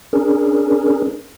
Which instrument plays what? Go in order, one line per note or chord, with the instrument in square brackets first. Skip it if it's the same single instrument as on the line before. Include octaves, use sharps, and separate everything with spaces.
[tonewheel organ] C#4 D4 G#4 A#4